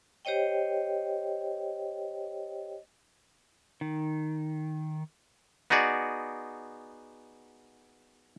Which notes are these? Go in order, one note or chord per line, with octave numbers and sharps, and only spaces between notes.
G4 C5 C#5 D#5 G5
D#3
B3 D#4 F#4 G#4 D5